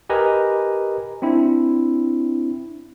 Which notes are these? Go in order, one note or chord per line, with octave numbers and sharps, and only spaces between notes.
G4 A#4 B4 D#5 G#5 A#5
C4 D4 E4